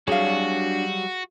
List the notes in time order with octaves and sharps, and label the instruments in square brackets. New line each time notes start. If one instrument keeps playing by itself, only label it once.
[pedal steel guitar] F#3 G3 [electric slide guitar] D4 C#5 [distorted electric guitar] F#4 [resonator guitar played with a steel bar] G#4 F5